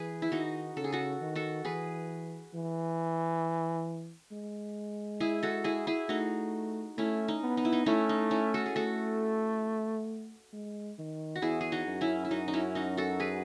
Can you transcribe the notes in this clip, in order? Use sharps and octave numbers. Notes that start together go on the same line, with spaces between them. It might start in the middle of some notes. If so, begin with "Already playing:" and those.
Already playing: E3 G#4 B4
E4
D#3 D#4 F#4
C#3 A4
G#4
F#4 A4
D#3
F#4 A4
E3 G#4 B4
E3
G#3
E4 G#4
F#4 A4
E4 G#4
E4 G#4
A3 D#4 F#4
A3 C#4 E4
D#4
B3
D#4
E4
D#4
A3 C#4 E4
D#4
C#4 E4
F#4 A4
G#4
A3 F#4 A4
G#3
D#3
F#4
E2 E4 G#4
G#4
D#4 F#4
F#2
C#4 E4
E4
F#2 D#4 F#4
D#4
C#4 E4
D#4 F#4
F#4 A4
G#4 B4